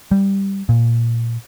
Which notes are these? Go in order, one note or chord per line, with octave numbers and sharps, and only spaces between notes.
G3
A#2